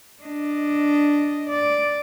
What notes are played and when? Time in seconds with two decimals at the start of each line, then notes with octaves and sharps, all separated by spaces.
0.23 D4 D#5
1.50 D5